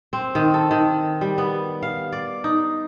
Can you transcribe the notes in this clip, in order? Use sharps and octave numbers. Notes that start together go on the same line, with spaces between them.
C4
D#3
A4
D#3
G3
B3
F5
D5
D#4